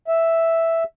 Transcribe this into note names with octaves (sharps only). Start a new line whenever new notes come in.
E5